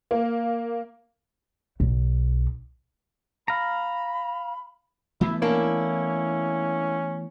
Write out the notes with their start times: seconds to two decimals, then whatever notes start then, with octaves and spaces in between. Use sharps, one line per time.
0.11 A#3
1.80 B1
3.48 F5 A#5 B5
5.21 E3 A3 B3 E4
5.42 A#3 C#4 D4 E4